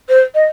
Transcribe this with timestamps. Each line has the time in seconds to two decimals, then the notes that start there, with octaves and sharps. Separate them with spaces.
0.08 C5
0.34 D#5